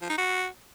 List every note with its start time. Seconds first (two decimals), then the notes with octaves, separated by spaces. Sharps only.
0.02 F3
0.10 D#4
0.18 F#4